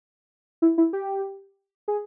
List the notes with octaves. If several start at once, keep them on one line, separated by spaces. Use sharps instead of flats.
E4
E4
G4
G#4